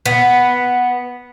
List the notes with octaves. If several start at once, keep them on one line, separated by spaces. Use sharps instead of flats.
B3